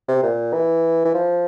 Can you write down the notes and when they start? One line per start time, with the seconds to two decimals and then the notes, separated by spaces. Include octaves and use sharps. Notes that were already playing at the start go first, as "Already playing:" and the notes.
0.08 C3
0.23 A#2
0.53 E3
1.05 E3
1.14 F3